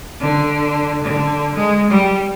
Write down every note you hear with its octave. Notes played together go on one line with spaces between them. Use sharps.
D3
D3
G#3
G3